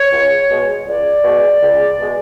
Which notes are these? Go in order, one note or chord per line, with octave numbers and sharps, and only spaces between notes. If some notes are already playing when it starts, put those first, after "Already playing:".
Already playing: C#5
C#2
B2 G#3
C#2 D5
B2 G#3
C#2
B2 G#3